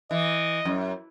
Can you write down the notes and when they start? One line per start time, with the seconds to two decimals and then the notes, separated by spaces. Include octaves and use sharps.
0.11 E3 D#5
0.65 F#2